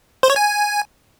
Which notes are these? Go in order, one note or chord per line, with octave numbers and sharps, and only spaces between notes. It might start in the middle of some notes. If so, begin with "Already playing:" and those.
C5
C#5
G#5